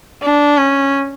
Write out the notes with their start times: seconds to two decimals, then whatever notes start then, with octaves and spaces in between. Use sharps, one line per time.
0.22 D4
0.58 C#4